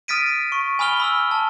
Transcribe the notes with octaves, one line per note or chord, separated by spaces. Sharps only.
D#6 F6 A6 B6 D7 D#7
C#6
G#5 B5 D#6 F6 F7 G7
B5 E6 F6
A5